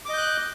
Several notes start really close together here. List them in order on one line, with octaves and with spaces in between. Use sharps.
D6 D#5 G6 F#6